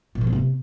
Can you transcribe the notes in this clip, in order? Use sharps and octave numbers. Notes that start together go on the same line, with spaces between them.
A#2
F3
A#3
C3